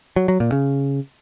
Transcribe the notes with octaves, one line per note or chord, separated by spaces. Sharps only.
F#3
F#3
A#2
C#3